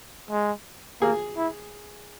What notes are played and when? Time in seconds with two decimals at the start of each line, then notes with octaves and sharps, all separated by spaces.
0.31 G#3
1.02 A#3 G#4
1.37 E4